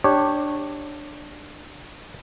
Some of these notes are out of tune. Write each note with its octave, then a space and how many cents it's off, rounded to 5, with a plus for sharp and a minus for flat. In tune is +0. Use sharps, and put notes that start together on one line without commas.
D4 +10 G4 +0 C#5 -10